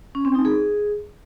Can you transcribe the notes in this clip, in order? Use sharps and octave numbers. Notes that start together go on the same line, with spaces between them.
C#4
C4
D#4
G#4